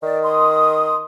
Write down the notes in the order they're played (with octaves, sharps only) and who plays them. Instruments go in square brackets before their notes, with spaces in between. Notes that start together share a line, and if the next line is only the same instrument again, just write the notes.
[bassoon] D#3 [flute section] D5
[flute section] C6 D#6